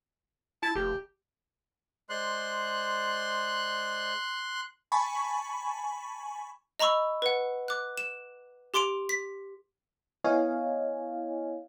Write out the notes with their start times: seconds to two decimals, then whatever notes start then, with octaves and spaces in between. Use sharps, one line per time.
0.63 E4 A5
0.75 F1 G4
2.09 G#3 C5 D5 C6 F#6
4.92 G#5 A5 B5 C#6
6.79 D#5 A#5 B5 C#6 E6
7.22 B4 F#5
7.68 D6 F#6
7.97 E7
8.74 G4 C6 D6 D7 F7
9.09 B6
10.24 B3 E4 C#5 D#5 F5 G#5